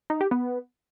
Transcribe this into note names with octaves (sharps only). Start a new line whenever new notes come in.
D#4
G4
B3